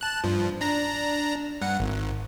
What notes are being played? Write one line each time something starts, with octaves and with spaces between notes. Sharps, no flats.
A5 F#6
G2 F3
D4 A#5 A#6
G2 F#5
G#1